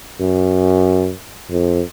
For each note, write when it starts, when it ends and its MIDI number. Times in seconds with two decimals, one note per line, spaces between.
0.20 1.13 42
1.51 1.81 41